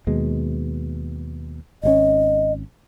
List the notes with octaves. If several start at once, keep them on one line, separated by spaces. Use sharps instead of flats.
D#2 B2 G#3
G#1 C3 C#4 D#5